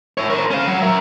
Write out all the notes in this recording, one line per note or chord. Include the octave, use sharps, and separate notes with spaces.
C#5 E5
A#4 C5
C#4 F5
F#3
A#4 E5